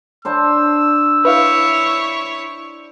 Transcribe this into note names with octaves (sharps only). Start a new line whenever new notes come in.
D4 C5 A5 E6
E4 B4 C#5 E5 F5